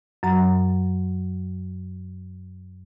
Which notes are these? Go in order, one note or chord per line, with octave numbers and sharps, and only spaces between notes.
F#2 F#3 A#5